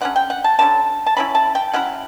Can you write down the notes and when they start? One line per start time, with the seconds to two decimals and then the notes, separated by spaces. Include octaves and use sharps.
0.01 D3 F#3 C#4 F#5
0.16 G5
0.30 F#5
0.44 A5
0.59 D3 F#3 C#4 A5
1.06 A5
1.17 F#3 C#4 E4 B5
1.35 A5
1.55 G5
1.73 F#3 C#4 E4 F#5